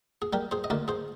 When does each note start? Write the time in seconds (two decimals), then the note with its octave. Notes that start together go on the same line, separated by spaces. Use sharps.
0.22 G#4
0.33 G3 G4 A#4
0.51 G#4 C5
0.64 D#5
0.70 D2 A#4 D5
0.88 G#4 C5